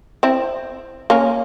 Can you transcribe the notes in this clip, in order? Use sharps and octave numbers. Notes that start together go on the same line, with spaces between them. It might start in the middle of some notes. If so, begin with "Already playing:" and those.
C4 E4
A#3 C#4